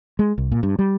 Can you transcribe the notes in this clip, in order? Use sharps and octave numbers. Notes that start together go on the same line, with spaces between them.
G#3
C2
A#2
G2
G3